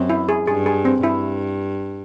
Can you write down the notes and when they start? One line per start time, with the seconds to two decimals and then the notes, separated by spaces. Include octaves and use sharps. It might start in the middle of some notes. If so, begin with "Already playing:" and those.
Already playing: F#2 C4
0.10 E4
0.29 G#4
0.47 G2 G#4
0.66 G#4
0.85 C4
1.03 G2 E4